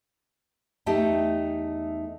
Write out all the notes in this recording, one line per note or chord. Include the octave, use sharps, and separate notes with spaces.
E2 A3 D#4 G4 A4 G5